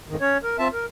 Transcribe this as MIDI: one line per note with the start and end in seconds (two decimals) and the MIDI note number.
0.09 0.16 41
0.09 0.16 44
0.09 0.16 51
0.21 0.38 61
0.21 0.38 73
0.43 0.57 70
0.59 0.68 60
0.59 0.68 65
0.59 0.68 76
0.59 0.68 81
0.73 0.86 70